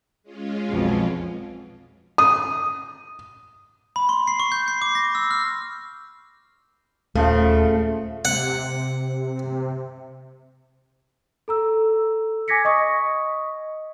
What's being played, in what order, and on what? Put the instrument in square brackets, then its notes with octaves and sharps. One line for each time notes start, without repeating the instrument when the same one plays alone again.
[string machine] G#3 C#4 F4
[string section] B1 F2 B2
[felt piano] D#6
[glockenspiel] B5
C6
C7
C#6
G6
C7
D6
A#6
E6
F6
[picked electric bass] D#1 [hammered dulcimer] C#3 F3 [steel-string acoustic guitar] A3
[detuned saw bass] C3 [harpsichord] F#5
[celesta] A4 A#5 E6
G#5 D6 G#6 A#6 B6 C#7
D#5 C#6 D#6